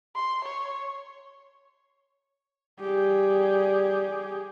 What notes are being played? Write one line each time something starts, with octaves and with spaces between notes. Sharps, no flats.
C6
C#5
G3 G4 G#4